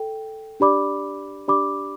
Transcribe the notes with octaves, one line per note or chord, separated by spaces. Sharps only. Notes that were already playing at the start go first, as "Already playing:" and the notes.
Already playing: A4 G5
D4 G4 D5 B5 D6
D4 G4 D5 B5 D6